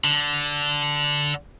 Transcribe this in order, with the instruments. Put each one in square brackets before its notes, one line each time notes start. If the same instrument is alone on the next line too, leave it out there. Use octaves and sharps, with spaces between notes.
[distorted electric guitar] D3